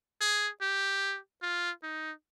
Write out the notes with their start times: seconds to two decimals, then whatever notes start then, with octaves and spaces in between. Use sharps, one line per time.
0.21 G#4
0.61 G4
1.42 F4
1.83 D#4